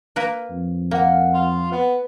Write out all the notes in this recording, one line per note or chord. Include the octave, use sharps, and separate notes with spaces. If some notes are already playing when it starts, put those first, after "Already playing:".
A#3 A#4 B4
F2
A#3 A#4 F5 F#5
F4
B3 B4